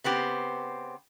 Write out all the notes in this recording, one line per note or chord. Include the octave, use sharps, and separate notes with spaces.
C#3 B3 C4 G4